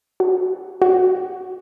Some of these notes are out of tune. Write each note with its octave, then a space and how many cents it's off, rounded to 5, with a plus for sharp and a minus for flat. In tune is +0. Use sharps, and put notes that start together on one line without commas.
F#4 +10
F#4 +0